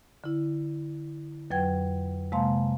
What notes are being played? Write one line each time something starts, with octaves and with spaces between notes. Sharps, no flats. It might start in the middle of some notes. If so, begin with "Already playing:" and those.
D3 E4
F2 F#3 B4 G5 G#6
C3 G#3 A#3 F5 A5 C6